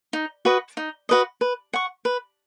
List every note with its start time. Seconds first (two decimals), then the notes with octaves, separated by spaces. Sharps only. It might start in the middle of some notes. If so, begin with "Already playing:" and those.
0.13 D#4
0.45 F#4 B4 D#5
0.77 D#4
1.09 F#4 B4 D#5
1.41 B4
1.73 F#5 C#6
2.05 B4